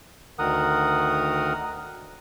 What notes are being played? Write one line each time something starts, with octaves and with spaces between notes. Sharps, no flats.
D2 D#3 A#4 F#5 D#6